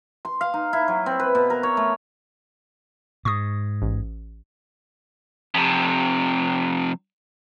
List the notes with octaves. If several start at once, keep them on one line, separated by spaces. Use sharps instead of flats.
C6
F5
D#4
E4
F#3
C4
B4
B2
A#4
C#5
A3
G#2 C#6 D#6
A1
F2 C3